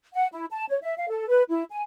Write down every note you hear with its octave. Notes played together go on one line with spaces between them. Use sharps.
F#5
E4
A5
C#5
E5
F5
A4
B4
E4
G#5